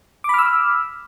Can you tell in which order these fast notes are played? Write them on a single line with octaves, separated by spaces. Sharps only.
D6 B5 F6 E6